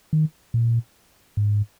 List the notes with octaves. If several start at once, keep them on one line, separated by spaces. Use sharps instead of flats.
D#3
A#2
G#2